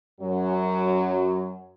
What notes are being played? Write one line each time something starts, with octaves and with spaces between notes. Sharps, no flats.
F#2 F#3